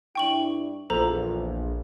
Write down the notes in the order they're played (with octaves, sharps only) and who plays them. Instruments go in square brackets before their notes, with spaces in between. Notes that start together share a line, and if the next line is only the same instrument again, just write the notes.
[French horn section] G2 D4 E4 [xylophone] G5 C#6 F#7
[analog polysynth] A#1 [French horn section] E2 F4 [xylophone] A4 C5 A#5